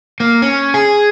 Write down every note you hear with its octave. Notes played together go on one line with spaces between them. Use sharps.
A#3
C#4
G#4